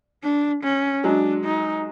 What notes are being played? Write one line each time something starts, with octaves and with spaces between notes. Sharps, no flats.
D4
C#4
F#3 G#3 D4
D#4